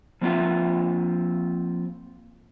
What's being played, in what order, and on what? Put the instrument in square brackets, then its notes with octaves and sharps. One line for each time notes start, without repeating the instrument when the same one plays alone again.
[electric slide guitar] F3 A#3 C4 E4 F4 E5